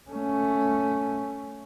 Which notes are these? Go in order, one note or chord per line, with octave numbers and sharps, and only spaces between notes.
A3 C#4